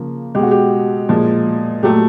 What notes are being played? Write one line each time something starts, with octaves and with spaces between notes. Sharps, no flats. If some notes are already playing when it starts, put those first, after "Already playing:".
Already playing: C#3 F3 A#3
B2 G#3 G4
F#4
G4
A#2 F3 G#3
A#2 F#3 A3 G4